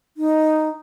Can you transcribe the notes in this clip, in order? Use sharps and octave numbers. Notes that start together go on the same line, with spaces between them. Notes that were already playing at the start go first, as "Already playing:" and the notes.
D#4